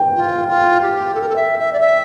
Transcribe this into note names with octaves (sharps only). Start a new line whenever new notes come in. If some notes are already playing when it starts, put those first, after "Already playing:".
Already playing: G5
F4
F4
G4
A4
A#4
A4
E5
E5
D5
E5